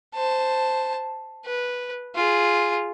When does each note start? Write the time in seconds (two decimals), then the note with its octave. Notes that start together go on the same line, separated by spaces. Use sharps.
0.15 C5 A5
1.45 B4
2.15 F4 G#4